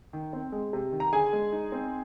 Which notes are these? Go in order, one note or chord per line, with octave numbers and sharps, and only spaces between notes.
D#3
C4
G#3
C3
D#3
A#5
D3 G#4 G#5
G#3
D#4
C4